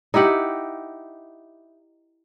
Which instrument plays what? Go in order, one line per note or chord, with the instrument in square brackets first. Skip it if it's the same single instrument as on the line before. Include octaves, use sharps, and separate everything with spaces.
[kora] D#4 E4 G4 F#5